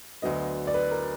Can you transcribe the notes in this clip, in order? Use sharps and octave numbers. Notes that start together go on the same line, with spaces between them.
D2 D3 F#3 B3 D#5
D5
B4
A#4